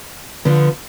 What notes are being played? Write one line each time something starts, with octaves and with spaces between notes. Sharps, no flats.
D3 F3 B3